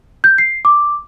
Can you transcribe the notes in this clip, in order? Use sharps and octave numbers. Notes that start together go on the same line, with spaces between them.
G6
C7
D6